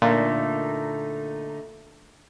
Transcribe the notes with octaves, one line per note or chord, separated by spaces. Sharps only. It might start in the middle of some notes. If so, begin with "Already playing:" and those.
A#2 D3 A3 D#4